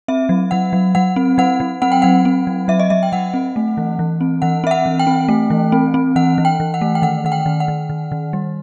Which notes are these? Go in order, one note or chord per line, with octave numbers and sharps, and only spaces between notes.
C4 E5
F#3
F#3 F#5
F#3
F#3 F#5
C4
F#3 F#5
F#3
C4 F#5
G5
F#3 F#5
C4
F#3
F#3 E5
D#5
F#3 E5
G5
F#3 F#5
C4
A3
E3
E3
C4
E3 F#5
C4 E5
F#5
E3
G5
C4
A3
E3
C4
C4
E3 F#5
E3
G5
E3
F#5
A3
G5
D#3 F#5
D#3 F#5
G5
D#3
F#5
D#3
D#3
D#3
G3